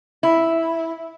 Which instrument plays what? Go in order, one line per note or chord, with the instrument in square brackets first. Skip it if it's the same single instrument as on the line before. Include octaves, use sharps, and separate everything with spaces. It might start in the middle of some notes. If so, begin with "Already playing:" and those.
[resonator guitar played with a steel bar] E4